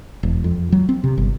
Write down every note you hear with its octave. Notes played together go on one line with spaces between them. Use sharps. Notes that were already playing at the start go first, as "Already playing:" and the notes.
E1
F2
F#3
C4
C3
G1